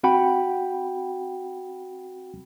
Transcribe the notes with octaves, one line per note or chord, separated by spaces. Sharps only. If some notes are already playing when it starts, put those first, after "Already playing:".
C4 F#4 F#5 G5 B5